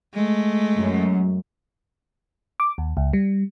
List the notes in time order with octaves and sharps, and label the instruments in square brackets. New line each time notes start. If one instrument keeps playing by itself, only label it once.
[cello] G#3 A3
[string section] F#2
[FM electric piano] D6
D#2
C#2
G3